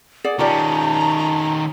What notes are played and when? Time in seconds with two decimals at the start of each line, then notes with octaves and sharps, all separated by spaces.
0.24 G#4 D5 F#5
0.39 D#3 C#4 F4 G4 D5 A5 A#5